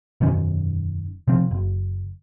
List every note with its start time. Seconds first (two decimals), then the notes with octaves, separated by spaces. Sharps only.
0.21 E1 F#2 D#3 C#4
1.28 C3 F3 C4
1.51 F#1